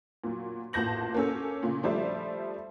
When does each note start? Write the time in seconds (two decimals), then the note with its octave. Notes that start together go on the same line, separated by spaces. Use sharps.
0.24 A#2 F#3
0.73 A1 A#2 A5 G6 A#6 F#7
1.14 A#3 C#4 A4
1.63 A#2 C#3
1.83 F3 G3 A3 C5 D5 E5